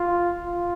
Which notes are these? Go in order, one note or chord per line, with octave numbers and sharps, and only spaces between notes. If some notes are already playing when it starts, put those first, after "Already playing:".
Already playing: F4
F4